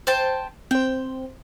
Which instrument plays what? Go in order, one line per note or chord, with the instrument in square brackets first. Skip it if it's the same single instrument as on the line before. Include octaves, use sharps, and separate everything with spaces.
[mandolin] C5 G5 A5
[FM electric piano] C4 C5 [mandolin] G5